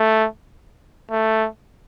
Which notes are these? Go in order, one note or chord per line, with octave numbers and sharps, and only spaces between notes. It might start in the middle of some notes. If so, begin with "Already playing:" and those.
Already playing: A3
A3